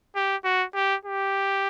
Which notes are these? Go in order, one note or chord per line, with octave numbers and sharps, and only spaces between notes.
G4
F#4
G4
G4